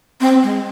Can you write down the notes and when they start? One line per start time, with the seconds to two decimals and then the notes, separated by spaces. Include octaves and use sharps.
0.21 C4
0.43 G#3